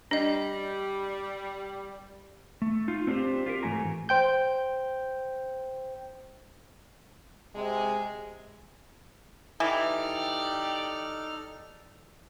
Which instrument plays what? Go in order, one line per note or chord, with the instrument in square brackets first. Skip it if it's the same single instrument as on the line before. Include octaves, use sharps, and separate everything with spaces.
[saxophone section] G3 [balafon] D4 D#5
[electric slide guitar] A3
D#4 F4
C4 D4 F4 G4 C5
F4 G4 A#4
G#2 E3 A3 G#5 A#5
[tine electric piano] C5 G5 G6
[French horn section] C3 G#3
[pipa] E3 [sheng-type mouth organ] D#4 A4 F6 [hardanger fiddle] G4 D5